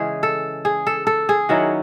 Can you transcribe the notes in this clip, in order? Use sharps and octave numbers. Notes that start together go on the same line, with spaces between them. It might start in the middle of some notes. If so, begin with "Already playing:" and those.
Already playing: C#3 E3 G#3 C#4 G#4
A4
G#4
A4
A4
G#4
D#3 F#3 C#4 E4 F#4